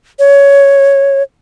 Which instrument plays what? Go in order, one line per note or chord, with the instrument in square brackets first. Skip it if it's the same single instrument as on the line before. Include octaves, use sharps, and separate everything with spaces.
[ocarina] C#5